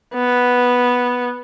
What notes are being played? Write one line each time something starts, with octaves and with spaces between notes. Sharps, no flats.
B3